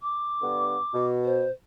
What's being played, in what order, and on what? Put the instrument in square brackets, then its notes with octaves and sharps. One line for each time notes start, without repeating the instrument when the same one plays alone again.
[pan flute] D6
[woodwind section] G2 D3 B3
B2
[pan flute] C5